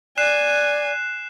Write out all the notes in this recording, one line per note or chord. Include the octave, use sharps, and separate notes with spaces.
D5 G#5 F#6 C7 E7